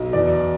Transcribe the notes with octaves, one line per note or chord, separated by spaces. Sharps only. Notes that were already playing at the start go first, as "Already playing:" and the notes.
Already playing: B1
E2 D5